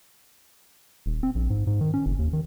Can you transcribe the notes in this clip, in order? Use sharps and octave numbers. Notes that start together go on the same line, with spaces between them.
D#1
C4
A#1
G#2
G#2
D#3
C#4
F#1
D#2
D#3